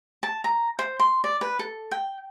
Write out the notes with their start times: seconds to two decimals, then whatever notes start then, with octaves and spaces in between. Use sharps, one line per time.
0.23 A5
0.44 A#5
0.79 C5
0.99 C6
1.24 D5
1.41 B4
1.59 A4
1.91 G5